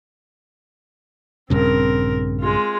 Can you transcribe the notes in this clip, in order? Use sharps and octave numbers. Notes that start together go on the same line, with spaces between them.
A#1 G2 C#3 C4 A#4
G#3 F4